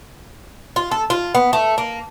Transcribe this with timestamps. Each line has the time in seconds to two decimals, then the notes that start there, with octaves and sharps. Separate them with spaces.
0.76 F4
0.91 A4
1.10 F4
1.35 B3
1.53 A3
1.78 A#3